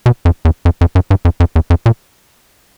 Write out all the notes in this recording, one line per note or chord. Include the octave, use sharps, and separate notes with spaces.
B2
F2
E2
F2
F2
F#2
G2
F2
F2
E2
F2
A#2